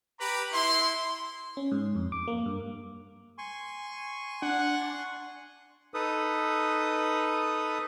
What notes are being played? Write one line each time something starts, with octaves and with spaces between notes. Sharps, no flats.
G4 B4 A#5 B5 D6
E4 C6
C#4
G#2
F2
D6
A#3
G2
G#5 C6 C#6
D4 F#5
D#4 A4 B4 D#6